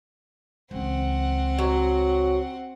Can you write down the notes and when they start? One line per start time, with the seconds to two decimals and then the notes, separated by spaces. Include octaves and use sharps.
0.71 C#2 E3 C4 F#5
1.58 F#3